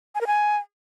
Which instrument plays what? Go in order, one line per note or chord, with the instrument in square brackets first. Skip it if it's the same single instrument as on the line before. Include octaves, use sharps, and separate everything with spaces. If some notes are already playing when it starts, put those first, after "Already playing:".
[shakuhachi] G#5
A#4
G#5